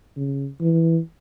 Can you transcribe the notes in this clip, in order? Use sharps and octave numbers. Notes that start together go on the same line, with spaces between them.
C#3
E3